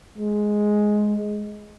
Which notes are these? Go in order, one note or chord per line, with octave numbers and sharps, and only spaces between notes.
G#3